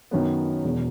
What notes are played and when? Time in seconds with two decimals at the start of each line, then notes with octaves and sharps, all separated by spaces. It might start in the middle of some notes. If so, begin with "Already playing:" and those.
0.11 F#2 D#3 F#3 B3
0.64 E1 E2 B2